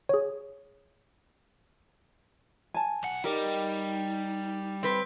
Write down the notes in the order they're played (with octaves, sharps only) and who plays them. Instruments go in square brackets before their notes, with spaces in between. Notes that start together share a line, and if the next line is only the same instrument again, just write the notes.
[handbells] G#4 C#5
[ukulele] G#5 A5
[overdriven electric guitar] B1 F#5
[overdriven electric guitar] G3 [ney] D#4 [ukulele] G4 A#4 D#5
[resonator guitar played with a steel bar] C4 B4